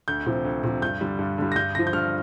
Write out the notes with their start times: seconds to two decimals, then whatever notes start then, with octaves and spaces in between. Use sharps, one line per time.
0.08 D2 G6
0.26 C3 F3
0.45 D2
0.64 C3 F3
0.82 G2 G6
1.01 D3 G3
1.19 G2
1.38 D3 G3
1.52 A#6
1.56 G2 G6
1.75 D3 F3 A#6
1.87 G6
1.93 G2 F6